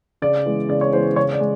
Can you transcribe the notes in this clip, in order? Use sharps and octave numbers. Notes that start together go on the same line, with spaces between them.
C#3 D5
E3 G#3 B3
C#3 D5
C#5
E3 G#3 B3 C5
C#3 C#5
D5
G#3